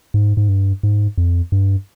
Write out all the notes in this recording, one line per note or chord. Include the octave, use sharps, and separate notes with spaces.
G#2
G#2
G2
G#2
F2
G2